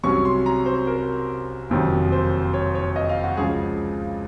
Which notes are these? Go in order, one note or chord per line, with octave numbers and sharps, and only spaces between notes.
C2 C3 F#3 C#4 C#6
C6
A#5
C5
A#4
F#1 F2 C3 D#3 F#3
C5
C#5
C#5
D#5
F5
F#4
C#2 C#3 F3 G#4